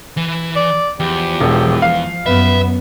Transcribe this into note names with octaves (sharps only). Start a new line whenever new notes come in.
E3
D5
E2 F3 G4
E1
F5
F#2 B3 B4 E5